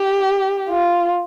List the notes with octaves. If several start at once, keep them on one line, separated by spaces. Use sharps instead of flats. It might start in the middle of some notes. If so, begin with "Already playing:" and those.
Already playing: G4
F4